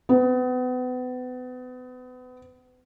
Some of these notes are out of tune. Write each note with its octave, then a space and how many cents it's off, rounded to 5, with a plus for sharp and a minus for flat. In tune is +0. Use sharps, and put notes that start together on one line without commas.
B3 +35